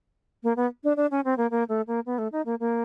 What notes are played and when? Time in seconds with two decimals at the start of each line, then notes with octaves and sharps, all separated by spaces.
0.43 A#3
0.57 B3
0.84 D4
0.97 D4
1.11 C#4
1.25 C4
1.37 A#3
1.51 A#3
1.69 A3
1.87 A#3
2.06 B3
2.18 A3
2.32 D#4
2.46 A#3
2.60 A#3